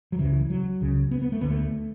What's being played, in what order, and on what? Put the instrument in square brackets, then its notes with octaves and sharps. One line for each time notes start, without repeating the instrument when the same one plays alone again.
[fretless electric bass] F#3
C#2 C#3 E3
F#3
C#2 C#3
B3
B3
A3
D2 D3 B3
A3